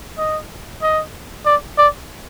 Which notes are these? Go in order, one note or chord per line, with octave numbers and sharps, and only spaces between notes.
D#5
D#5
D5
D5